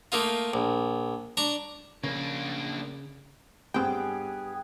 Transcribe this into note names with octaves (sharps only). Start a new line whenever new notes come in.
A3 A#3 D#4 F4
A#1
D4 A#5 C#6
C#3 A#3 D4
G2 B3 C4 G4 G#4 G5